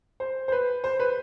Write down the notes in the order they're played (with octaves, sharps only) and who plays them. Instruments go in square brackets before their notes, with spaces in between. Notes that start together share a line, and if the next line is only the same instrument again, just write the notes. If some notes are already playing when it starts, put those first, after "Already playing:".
[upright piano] C5
C5
B4
C5
B4